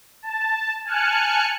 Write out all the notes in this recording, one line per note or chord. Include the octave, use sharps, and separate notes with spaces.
A5
G#5 A5 F6 F#6 C#7